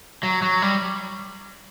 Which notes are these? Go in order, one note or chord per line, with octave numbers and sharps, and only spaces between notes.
F#3
F#3
G3